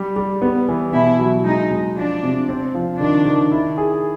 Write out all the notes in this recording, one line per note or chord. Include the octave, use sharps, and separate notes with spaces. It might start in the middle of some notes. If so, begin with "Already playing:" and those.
Already playing: G3
G3
B3
E3
B2 E4
F#3
G#3 D#4
G#3
F3 D4
C3
C4
F3
D#3 D4
D#3
E4
G#4